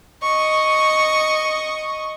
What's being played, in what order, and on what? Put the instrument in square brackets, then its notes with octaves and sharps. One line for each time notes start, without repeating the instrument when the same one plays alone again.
[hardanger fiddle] D#5 C#6